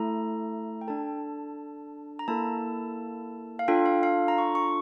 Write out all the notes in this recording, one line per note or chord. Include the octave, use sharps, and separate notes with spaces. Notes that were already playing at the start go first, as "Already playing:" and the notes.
Already playing: A3 E4 A4 A#5
G5
D4 A4 A5
A#5
A#3 E4 A4 A5
F5
D4 F4 A4 G5
F5
F5
A#5
C#6
C#6